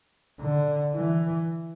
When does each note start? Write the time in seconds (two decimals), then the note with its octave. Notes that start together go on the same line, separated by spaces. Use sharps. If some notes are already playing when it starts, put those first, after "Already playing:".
0.41 D3
0.95 E3